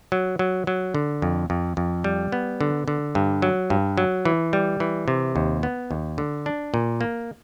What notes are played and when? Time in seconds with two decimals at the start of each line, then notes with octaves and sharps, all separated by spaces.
0.12 F#3
0.39 F#3
0.67 F#3
0.95 D3
1.22 F2
1.50 F2
1.77 F2
2.04 G3
2.32 B3
2.61 D3
2.88 D3
3.15 G2
3.42 F#3
3.70 G2
3.98 F#3
4.25 E3
4.53 G3
4.80 E3
5.08 C3
5.36 D#2
5.63 B3
5.91 D#2
6.18 D3
6.46 D4
6.74 A#2
7.01 A#3